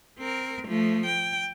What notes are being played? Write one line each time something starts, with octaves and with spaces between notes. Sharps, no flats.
C4 A#4
F3 A3
G5